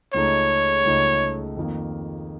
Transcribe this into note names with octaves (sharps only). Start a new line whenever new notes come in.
C#2 C#3 A3 D#4 C#5
C#2 C#3 A3 D#4
F2 D#3 A#3